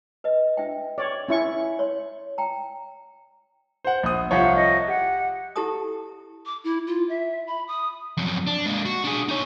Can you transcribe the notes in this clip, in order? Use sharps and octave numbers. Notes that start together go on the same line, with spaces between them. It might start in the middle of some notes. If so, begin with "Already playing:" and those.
B4 D#5
D4 E5 G5
C#5 D5
C#4 E4 C#6
C#5 C6
G5 A#5
C5 F#5
A#1 D#6
C2 F3 C#5 F#5
D#5
G4 F#5
E4 G4 A4 A5 A#5 D#6
D6
E4
F4
E5
B5
D#6
F2 F#3
D4
G#3 A#3
F#4
D4 G#4
D#4 C#5